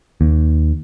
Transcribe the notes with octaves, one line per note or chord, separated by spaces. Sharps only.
D#2